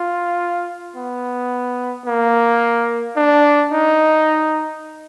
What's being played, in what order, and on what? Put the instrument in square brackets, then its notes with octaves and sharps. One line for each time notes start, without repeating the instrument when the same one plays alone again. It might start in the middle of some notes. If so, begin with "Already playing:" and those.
Already playing: [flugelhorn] F4
B3
A#3
D4
D#4